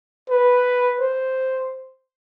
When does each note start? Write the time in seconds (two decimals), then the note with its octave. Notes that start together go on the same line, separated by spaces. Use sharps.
0.30 B4
1.01 C5